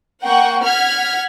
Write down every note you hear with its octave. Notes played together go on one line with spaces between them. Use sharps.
A#3 F#5 G5 C#6
F#5 F6 G#6 B6